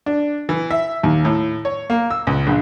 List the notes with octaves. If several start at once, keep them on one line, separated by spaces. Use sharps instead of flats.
D4
E3
E5
D#2
A2
C#5
A#3
E6
C#2
A#1